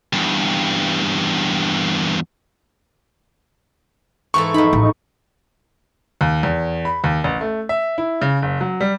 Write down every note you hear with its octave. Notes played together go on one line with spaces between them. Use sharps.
E2 G2
G#2 E3 A4 C#6
F2 D#4 B5
A1
D#2
E2
B5
D#2
A1
A3
E5
E4
C#3
F#1
F#3
G3